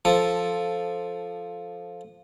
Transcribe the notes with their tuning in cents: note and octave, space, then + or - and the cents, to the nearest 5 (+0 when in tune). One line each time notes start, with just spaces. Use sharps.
F3 +0 A4 +0